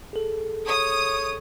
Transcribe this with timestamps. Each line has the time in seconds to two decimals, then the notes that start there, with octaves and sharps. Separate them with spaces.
0.13 G#4 A4
0.67 C#5 D#6